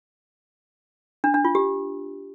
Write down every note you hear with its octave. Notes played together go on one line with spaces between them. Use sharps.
D4
D4
F4
G4